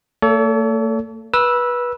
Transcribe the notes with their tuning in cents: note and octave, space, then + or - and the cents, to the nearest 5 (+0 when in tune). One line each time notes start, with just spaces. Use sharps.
A3 +45 A4 +0 C#5 +45
B4 -20 E6 +0